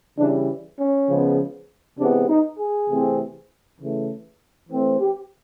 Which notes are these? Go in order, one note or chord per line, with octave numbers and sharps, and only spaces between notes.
C#3 E3 G3 D4
C#4
C#3 F3 G#3 B3
C3 E3 G#3 B3 D4
D#4
G#4
C3 E3 A3 C4
C#3 E3 A3
E3 A3 C4
G4